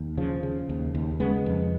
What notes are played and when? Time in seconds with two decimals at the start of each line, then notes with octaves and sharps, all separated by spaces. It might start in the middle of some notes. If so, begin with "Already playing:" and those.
Already playing: D#2
0.17 C#3 F3
0.43 C#3
0.69 D#2
0.95 D#2
1.20 C#3 G#3 B3
1.46 F2